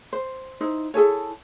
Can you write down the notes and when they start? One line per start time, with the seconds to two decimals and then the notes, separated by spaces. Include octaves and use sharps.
0.13 C5
0.61 D#4 E4 C5
0.94 E4 G#4 A4 C#5